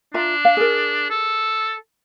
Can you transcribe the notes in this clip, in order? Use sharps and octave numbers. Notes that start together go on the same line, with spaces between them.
D4 F4 E5 A#5
F5
G#4 A#4
A4